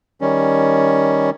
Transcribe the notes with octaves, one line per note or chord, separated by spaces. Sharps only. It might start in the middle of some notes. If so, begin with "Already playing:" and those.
D#3 G3 C#4